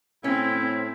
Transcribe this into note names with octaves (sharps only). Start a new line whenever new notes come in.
A2 C4 C#4 E4